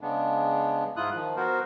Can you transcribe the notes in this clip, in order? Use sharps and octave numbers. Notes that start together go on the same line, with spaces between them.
C#3 G#3 B3 D4
G#2 E4 F4 D#6 F#6
D#3 F3
B3 F#4 A#4 C5